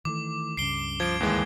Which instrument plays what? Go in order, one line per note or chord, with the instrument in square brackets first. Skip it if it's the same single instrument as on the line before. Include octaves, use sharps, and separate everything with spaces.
[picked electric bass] D#3 E3 A3 [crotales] D6
[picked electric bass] C#2 G2 C#3 [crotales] C7 D7 G7
[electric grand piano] F3 [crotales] G#6 D7
[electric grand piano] D#2 E3 G#3